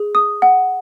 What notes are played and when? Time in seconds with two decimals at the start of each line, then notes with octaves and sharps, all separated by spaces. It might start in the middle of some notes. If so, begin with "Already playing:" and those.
Already playing: G#4
0.15 D#6
0.42 F#5